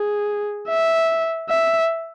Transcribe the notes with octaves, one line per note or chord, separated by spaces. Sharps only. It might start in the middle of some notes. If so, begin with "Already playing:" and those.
Already playing: G#4
E5
E5